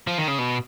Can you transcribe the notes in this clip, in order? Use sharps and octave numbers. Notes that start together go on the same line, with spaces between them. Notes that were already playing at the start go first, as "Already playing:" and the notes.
F3
D#3
C#3
B2